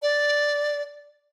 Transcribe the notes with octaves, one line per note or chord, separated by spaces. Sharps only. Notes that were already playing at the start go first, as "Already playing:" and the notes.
D5